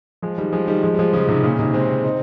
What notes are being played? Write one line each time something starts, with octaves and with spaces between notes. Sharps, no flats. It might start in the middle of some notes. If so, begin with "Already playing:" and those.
F3 G#3
D#3 G3
F3 G#3
D#3 G3
F3 G#3
G3
F3 G#3
C#3 F3
C3 D#3
A#2 C#3
C3 D#3
G#3 C4
C4 D#4